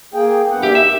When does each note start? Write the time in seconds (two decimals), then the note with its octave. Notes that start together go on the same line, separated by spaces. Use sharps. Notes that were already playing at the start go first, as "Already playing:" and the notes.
0.14 A#3 G#4 G5
0.51 G2 B3 F#5
0.63 A#3 D4 G4 E5
0.75 D#3 E5